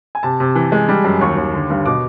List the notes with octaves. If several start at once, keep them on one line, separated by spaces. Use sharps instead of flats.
G#5
C3 A5
C3
E3
G#3
G3
F#2
D#2 C#6
D#2
D3
G2
B2 D6